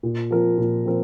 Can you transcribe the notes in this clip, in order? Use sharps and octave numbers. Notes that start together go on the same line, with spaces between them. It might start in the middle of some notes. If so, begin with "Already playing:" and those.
A#2
F3 C4 F4 A#4
A#2
F3 C4 F4 A#4